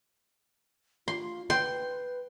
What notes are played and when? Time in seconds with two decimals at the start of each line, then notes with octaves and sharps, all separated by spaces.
1.08 F4 C6
1.50 B4 G5 C6